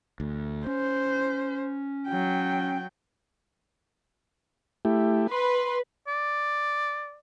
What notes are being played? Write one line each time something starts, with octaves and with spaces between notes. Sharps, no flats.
D2
C#4 C5
F#3 G5
A3 E4 G4
B4 C6
D5